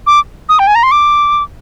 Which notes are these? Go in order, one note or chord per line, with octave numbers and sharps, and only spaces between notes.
D6
D#6
G5
G#5
A#5
C6
D6